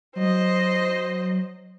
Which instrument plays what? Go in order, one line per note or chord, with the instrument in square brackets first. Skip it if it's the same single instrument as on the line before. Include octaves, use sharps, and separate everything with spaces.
[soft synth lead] F#3 [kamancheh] C5 D#5